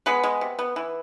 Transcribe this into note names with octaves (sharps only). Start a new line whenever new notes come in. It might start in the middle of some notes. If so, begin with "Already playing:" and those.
G#3 B3 B4
G#3
C3
B3
E3